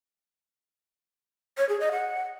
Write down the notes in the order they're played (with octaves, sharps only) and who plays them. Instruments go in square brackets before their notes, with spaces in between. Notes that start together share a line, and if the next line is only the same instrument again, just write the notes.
[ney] C#5
G#4
D#5
F#5